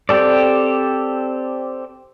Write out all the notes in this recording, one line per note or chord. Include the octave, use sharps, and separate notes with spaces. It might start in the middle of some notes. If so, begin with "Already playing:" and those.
C4 G4 A4 D5